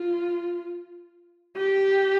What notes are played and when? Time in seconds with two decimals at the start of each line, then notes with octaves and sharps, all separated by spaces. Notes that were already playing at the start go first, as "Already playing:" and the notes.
Already playing: F4
1.57 G4